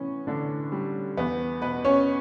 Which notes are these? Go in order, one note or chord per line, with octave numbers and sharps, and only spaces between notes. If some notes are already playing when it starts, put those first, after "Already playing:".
Already playing: A2 E3 B3 C#4
A2 D3 D4
G3
E2 B3
B2 B3 B4
C#4 C#5